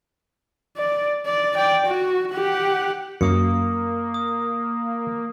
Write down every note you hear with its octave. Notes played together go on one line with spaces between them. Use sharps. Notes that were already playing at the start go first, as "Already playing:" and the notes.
D5
D5
D5 G5
F#4
G4 F#5
F#2 A#3 D#6 C#7
D#6